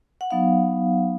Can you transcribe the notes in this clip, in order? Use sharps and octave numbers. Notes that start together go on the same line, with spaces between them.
F#5
F#3 B3 D#4 F5